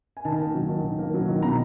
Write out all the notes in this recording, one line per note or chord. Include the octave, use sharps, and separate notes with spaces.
G#5
D#3 A5
A#3
F#3
D#3
D#3
A#3
F#3
D#3
B2 A#5